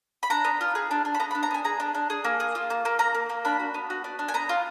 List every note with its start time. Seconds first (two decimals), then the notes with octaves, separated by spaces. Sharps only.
0.23 B5
0.30 D4 A#5
0.45 B3
0.61 F4
0.75 G#4
0.91 D4
1.05 D4
1.14 B5
1.20 B3 A#5
1.31 B5
1.35 D4
1.43 A#5
1.51 B3 G#5
1.65 G#4 A#5
1.80 D4
1.95 D4
2.10 G#4
2.25 A#3
2.40 G#4
2.55 F4
2.70 A#3
2.85 A#3
2.99 A#3 A#5
3.15 A#3
3.29 A#3
3.45 D4 B5
3.59 F#4
3.74 B3
3.90 F#4
4.04 D4
4.19 D4
4.28 G#5
4.34 B3 A#5
4.49 F4